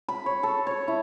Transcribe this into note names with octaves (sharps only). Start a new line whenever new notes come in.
B5
C#5
A4
C#5
E4